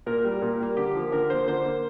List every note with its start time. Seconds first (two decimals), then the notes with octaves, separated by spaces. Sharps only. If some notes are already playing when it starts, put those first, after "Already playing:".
0.06 A#2 A#4
0.24 G3 A#3
0.42 A#2
0.60 G3 A#3
0.77 D3 G4
0.95 F3 A#3
1.12 D3 A#4
1.30 F3 A#3 C5
1.48 D3 C5
1.65 A#3